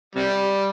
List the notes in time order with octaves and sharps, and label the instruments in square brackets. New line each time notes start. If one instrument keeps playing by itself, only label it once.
[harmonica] C3 G3